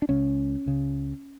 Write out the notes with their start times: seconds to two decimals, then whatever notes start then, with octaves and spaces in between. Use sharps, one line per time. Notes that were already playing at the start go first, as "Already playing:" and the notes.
0.02 D4
0.09 C#2 C#3 C#4
0.66 C#2 C#3